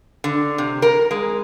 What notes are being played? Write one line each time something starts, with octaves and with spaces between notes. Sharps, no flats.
D3
C3
A#4
G#3